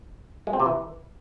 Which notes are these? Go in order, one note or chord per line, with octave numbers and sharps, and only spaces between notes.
G#3
C4
C3
E3